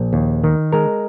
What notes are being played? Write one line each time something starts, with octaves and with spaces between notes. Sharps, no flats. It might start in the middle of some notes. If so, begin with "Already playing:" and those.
Already playing: A#1
D#2
D#3
G#3 A#4